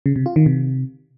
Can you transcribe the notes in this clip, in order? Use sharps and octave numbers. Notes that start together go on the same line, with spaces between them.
C#3
C3
F4
D#3
C3